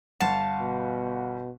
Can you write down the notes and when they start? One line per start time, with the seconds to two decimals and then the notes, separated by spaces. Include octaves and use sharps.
0.20 G1 F5 F#5 A5 E7
0.60 B2